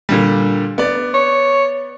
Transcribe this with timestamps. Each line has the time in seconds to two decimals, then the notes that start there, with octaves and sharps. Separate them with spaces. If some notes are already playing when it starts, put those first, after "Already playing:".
0.09 A#2 D3 G3
0.78 B3 D5
1.14 C#5